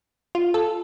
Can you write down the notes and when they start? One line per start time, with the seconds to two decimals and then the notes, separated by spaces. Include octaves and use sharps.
0.35 F4
0.54 A4